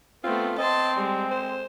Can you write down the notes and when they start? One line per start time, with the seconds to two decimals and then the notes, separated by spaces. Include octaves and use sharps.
0.24 A3 B3 C4 F4
0.58 C4 D#5 A5 C6
0.97 G3 G#3
1.31 C5